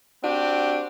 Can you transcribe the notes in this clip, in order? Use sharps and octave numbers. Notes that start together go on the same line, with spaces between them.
C4 D4 F#4 G4